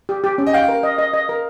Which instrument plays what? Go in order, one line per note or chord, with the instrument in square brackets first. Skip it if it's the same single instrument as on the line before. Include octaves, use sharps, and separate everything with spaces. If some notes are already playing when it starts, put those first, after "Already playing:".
[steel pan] G4
G4
C#4
[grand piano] D#5
[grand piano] F5 [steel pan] G5
[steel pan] A#4
D#5
D#5
D#5
A#4